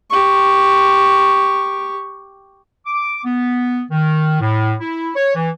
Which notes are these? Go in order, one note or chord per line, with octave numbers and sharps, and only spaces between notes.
G4 C#6
D6
B3
D#3
A2
E4
C#5
E3